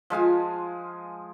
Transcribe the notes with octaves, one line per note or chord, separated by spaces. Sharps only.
F3 G#3 F5 G#5